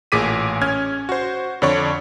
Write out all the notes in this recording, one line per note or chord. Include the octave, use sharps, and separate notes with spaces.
A1 A#2 G#4 D6 B6 D#7
C#4 F6 G#6
F#4 C5
F2 D3 C#5 D5 C#6